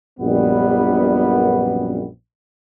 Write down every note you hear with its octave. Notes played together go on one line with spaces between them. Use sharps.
A#1 F#2 G3 B3